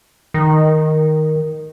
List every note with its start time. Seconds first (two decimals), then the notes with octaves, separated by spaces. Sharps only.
0.34 D#3